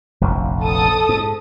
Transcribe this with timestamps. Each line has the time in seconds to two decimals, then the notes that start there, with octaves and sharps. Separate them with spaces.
0.21 F1 A#1 F2
0.61 A4 A5 D#6
1.09 G#2